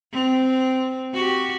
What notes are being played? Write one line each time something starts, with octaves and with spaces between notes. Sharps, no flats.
C4
F#4 G4